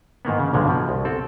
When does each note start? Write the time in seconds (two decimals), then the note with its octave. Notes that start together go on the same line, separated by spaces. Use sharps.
0.25 G#2 D#3 A#3 B3
0.39 C#3
0.53 B1 G2 A#2 D3 F3 G#3
0.67 B2 F3
0.89 C2
1.05 C4 A4